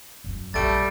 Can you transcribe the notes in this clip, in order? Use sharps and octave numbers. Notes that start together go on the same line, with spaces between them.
F#2 F#3
A#1 G3 A3 F4 A6 D7